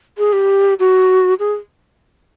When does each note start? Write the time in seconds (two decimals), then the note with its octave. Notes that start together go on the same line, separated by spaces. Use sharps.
0.18 G#4
0.33 G4
0.80 F#4
1.39 G#4